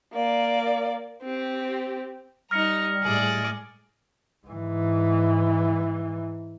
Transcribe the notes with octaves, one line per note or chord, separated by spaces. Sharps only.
A#3 D5
C4 G4
G3 D#4 A#5 F6 A#6 C#7
A2 G#3 G#4 D5
G#2 E3